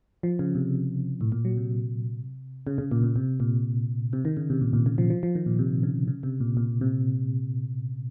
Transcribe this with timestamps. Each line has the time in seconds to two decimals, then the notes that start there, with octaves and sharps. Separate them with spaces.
0.23 F3
0.39 C#3
0.55 C3
1.21 A2
1.32 A#2
1.45 F#3
1.57 C3
2.67 C#3
2.78 C#3
2.91 A#2
3.03 A#2
3.16 C3
3.40 A#2
4.13 C3
4.25 D#3
4.37 C#3
4.50 C3
4.61 A#2
4.73 A#2
4.86 C#3
4.98 F3
5.10 F3
5.23 F3
5.35 D#3
5.46 A#2
5.59 C3
5.83 C#3
6.07 C#3
6.23 C3
6.40 A#2
6.57 A#2
6.81 C3